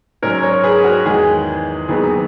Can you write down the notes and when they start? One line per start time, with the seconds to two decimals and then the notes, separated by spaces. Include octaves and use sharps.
0.22 G#2 F#3 C#4 A#4 C#5
0.43 A#4 C#5
0.63 G#4 B4
0.84 F#4 A#4
1.05 E2 D#3 G#3 G#4
1.88 D#2 D#3 F#3 B3 G#4